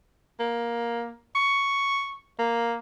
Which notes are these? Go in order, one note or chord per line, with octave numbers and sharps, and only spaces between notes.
A#3
C#6
A#3